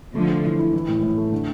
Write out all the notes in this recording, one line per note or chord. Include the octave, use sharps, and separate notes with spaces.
D3 F3 A3
A4
E3
E4
E3
A2
A2
A3
D3